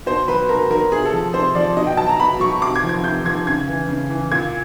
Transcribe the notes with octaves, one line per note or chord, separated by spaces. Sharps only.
B2 C5
F#3 B4
B2 A#4
F#3 A#4
C3 G#4
A4
F3
C3 C5
F3 D5
B2 D#5
G5
F#3 A5
A#5
B2 B5
F#3 C#6
C3 D6
G#6
F3
G#6
C3 G6
F3 G#6
C#3 G#6
E3
C#3
E3
A#2 G#6